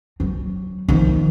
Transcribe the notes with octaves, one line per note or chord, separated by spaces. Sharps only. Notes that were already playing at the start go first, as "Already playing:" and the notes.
F#3
D#3 F3